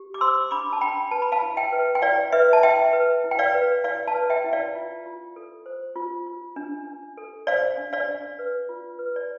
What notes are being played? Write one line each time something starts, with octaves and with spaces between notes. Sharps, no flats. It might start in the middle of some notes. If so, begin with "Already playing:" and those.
Already playing: G4
D6
C5 C6 E6
D4 B5 D6
A5
D4 G5 B5
B4 A5
B5
F5 A5
E4
E5 G5
B4
G5
E4 D5 F5
B4 E5
A5
E4 E5 G5
B4
E4
G5
D5 F5
B4
E4 D5 F5
F5 A5
B4
E5 G5
E4
D5 F5
F4
F4
A4
C5
F4
F4
D4
D4
A4
C5 D5 F5
D4
D5 F5
D4
B4
F4
B4
D5